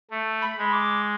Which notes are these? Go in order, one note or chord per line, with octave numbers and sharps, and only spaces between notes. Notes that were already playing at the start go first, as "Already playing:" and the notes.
A3
B5
G#3
D6